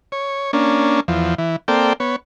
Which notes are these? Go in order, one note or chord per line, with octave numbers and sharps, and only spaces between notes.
C#5
A#3 C#4 D4
E2 F3
E3
A#3 C4 A4 D5 G5
B3 C#5